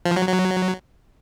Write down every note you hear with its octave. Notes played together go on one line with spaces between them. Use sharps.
F3
F#3
F#3